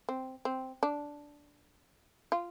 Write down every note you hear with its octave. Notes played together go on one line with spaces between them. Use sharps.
C4
C4
D4
F4